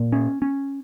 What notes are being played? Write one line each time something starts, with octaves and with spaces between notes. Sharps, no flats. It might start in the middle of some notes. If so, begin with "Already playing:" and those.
Already playing: A#2
C#4
C#4